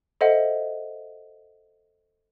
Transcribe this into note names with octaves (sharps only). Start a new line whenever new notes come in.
A4 C5 D#5 E5 F#5